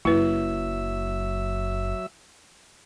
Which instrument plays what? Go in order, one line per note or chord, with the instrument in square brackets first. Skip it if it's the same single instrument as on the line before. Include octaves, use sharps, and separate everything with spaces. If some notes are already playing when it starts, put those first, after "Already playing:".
[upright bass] F#1 [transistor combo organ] F#3 E5 E6 [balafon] E4 B4